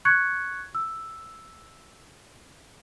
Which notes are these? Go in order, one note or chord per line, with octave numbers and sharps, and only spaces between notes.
C#6 F#6 G#6 C#7
E6